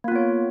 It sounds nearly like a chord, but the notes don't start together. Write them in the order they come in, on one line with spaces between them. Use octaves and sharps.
A#3 F4 B3 C#5